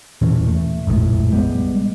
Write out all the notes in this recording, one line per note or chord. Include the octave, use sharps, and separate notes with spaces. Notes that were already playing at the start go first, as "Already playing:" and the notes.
E1 A#2 E3 C#4
A3
F1 A#1 A2 G#3
G3 G#3 B3